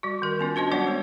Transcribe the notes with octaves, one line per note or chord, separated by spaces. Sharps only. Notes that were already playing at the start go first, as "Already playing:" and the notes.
G3 F#4
D#3 A#4
B3 C#4 F4
D4 F#4 C5 D#5
F#3 G3 B3 D4 C#5 F#5
G#3 B3